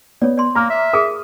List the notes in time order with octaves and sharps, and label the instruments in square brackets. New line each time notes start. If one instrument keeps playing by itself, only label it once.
[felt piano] B3 [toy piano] C#5 D5
[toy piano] D5 C6
[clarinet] A#3 [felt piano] A#5 F6
[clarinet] E5
[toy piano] G#4 A#4 [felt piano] D#6